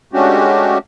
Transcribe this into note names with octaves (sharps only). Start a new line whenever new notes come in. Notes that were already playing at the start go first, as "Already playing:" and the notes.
G#3 A3 C#4 D4 F#4 G4